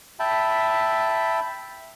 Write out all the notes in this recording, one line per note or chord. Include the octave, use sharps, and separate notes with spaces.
E5 G5 A5 B5